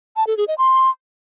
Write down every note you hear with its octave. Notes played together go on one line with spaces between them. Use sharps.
A5
A4
G#4
D#5
C6